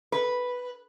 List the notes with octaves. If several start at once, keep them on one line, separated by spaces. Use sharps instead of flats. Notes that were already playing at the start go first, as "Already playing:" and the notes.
B4